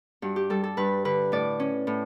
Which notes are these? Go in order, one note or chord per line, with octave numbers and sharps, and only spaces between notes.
G2 F#4
G4
G3 A4
A4
G2 B4
D3 B4
A2 D5
C#4
A2